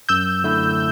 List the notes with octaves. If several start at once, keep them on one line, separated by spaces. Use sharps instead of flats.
F#2 E6 G6
D3 A3 E4